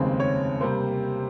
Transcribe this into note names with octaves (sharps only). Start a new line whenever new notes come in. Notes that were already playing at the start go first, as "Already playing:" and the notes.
Already playing: F1 D#2 C#3 G#3 C4
C#5
C3 G3 A#3 C5